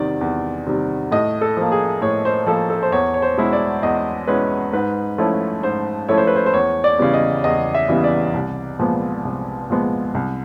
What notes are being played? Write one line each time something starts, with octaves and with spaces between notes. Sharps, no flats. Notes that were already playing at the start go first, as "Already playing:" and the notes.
Already playing: E2 C3 D#3 G3 D5
E2
C3 D#3 G3
A2 D#5
A4
F3 A#3
G#4
A2 C#5
C5
F3 A#3 A4
A4
C5
E2 C#5
C#5
C5
B2 G#3 C#4 E4
D5
E2 D#5
B2 G#3 C#4 E4 B4
G#2 B4
F3 A3 C#4 E4
G#2 C5
F3 A3 C#4 E4 C#5
C5
B4
C5
C5
E2 C#5
D5
C#3 E3 G3 B3
D#5
E2 D#5
E5
C#3 E3 G3 B3
D5
C2
A#2 F3 G#3 B3
C2
A#2 F3 G#3 B3
C2